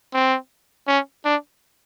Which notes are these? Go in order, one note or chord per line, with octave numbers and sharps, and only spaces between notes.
C4
C#4
D4